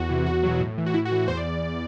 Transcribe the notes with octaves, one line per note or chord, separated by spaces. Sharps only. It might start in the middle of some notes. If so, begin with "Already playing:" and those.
Already playing: E2 F#4
C3 E3
E2 F#4
B2 F#3
A2
E3
F#4
A2 E4
F#4
E3
F#4
E2 C5
D5